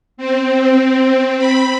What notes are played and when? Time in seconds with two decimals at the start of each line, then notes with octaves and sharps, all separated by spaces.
0.17 C4
1.38 B5